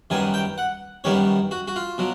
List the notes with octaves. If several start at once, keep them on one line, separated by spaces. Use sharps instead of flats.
F#2 D#3 G3 B3 G#5
G5
F#5
F#2 D#3 G3 B3 C#5
F#4
F#4
F4
B2 F#3